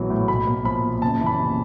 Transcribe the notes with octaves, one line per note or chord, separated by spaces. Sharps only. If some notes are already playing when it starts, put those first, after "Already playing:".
Already playing: A#1 E3 F#3 B3
A2
B1 B5
A#3
F3 B5
A#2
F#1 A5
E3
B5
C3